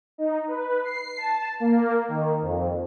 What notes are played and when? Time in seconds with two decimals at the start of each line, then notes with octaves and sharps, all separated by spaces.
0.18 D#4
0.48 B4
0.84 C7
1.17 A5
1.60 A#3
2.08 D#3
2.41 F2